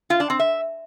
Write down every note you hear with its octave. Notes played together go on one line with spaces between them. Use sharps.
F4
D4
C4
E5